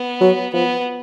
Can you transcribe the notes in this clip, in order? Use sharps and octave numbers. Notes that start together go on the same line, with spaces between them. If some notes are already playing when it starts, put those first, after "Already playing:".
Already playing: B3
F#3
F3 B3